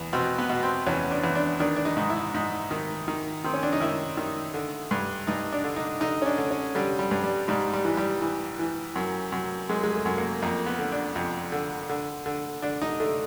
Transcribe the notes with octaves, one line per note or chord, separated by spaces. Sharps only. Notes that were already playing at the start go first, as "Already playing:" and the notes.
Already playing: E2
B2 C4
B3
B2
C4
E2 C#4
D4
E2
D4
D#3 D4
D4
D#4
G#2
E4
G#2
D#3
D#3
D#3 C4
C#4
D4
D#4
D#3 E4
D#3
D3
G2
G2 D#4
D4
D3
D#4
D3 D#4
C#4
D4
D3
C#4
D3 G3
G3
G2
G3
G#2 G3
G3
E3
G3
E3
E3
F#2
F#2
F#2 G#3
G#3
A3
F#2
A#3
F2 A#3
B3
D3
D4
F2
D3
D3
D3
D3 D4
D#4
D3 A3